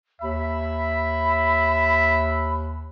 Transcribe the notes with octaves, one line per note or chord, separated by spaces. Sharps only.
D#2 E5 B5